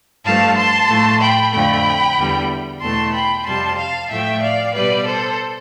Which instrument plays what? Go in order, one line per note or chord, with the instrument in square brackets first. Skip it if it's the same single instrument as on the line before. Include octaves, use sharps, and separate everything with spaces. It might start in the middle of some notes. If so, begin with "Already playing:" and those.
[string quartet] G2 F3 A3 F5 A5
A5 C6
A2 F3 A3
G5 B5
F2 D3 F3 A3 G5 B5
E2 D3 G3
E2 B2 A3 A5 C6
G5 B5
F2 C3 G3 A5 C6
F5 A5
A2 F3 A3 E5 G5
D5 F5
B2 G3 B4 D5
A4 C5